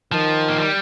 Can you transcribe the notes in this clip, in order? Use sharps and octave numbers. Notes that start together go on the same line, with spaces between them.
D#3 F3
A#3
G3